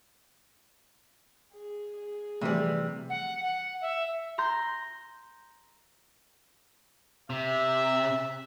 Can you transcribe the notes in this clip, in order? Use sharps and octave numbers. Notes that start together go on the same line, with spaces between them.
G#4
G#4
C3 E3 F3 G3 A3
F#5
F#5
E5
A#5 C6 G6 A#6
C3 E5